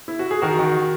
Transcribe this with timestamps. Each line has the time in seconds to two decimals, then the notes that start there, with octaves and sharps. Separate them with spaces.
0.08 E4
0.19 F#4
0.31 G#4
0.42 D#3 F#4 A#4
0.59 D#3